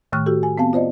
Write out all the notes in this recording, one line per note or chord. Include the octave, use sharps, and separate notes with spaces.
A2 D#3 A3 C#6 F6 F#6
F#4 G4 A4
G#5
B3 C4 F5 A5
F4 C5 D5 D#5